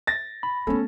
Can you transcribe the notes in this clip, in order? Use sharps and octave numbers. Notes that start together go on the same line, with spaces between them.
A6 A#6
B5
A3 B3 C#4 A4